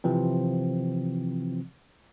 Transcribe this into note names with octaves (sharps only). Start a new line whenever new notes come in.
C3 E3 F3 C4